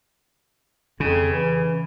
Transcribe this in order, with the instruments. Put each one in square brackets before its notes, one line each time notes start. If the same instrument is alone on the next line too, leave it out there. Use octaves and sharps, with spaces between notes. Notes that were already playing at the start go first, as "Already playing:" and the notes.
[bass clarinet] F2 [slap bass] C#3
[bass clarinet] E3